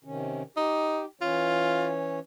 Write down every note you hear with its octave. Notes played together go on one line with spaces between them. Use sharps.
C3 D#3 C#4
D#4 G4
E3 C#4 F4 C#5